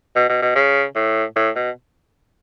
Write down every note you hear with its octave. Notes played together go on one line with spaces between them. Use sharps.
B2
B2
B2
C#3
A2
A2
B2